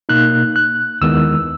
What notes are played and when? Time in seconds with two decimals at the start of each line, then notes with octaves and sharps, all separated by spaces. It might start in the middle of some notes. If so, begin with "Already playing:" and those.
0.09 B2 A#3 D#4 F#6
0.56 F#6
1.01 D#2 D#3 G#3 B3 E4 E6